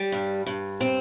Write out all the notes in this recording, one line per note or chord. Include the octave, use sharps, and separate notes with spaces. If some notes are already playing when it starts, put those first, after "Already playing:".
Already playing: G3
G2
G2
C4